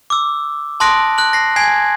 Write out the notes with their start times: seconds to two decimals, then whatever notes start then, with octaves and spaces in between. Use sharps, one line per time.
0.10 D6 E6
0.80 A5 C6 D#6 F#6 A#6 D7
1.18 F#6 F#7
1.33 A#6 C7
1.56 G#5 G#6 C7